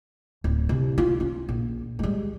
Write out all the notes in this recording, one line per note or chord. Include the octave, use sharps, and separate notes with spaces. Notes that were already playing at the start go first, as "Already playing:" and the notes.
D1
C2
F4
C#4
A#1
G3 G#3